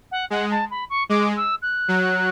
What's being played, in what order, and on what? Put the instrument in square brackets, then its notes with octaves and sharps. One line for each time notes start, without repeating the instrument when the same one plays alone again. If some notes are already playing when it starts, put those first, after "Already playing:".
[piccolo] F#5
[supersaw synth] G#3 [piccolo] F#5
[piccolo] A5
B5
C#6
[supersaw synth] G#3 [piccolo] D6
[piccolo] E6
F#6
[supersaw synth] F#3